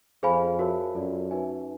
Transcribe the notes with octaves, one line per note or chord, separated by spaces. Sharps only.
F2 G#4 C5 F5 G#5 B5
F#4 A#4 C#5 E5 A5
F#2 F4 A4 D5
D#4 F#4 B4 E5 G#5